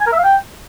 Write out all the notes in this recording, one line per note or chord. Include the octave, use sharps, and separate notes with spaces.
G#5
A#4
E5
F5
G5